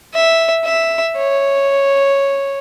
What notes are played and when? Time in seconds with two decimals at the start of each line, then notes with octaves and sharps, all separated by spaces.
0.14 E5
0.65 E5
1.16 C#5